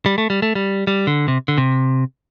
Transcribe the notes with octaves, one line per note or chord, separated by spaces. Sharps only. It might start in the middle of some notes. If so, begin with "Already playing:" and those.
G3
A3
G3
A3
G3
G3
D3
C3
D3
C3